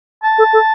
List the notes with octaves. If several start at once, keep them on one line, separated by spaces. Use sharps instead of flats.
A5
A4
A4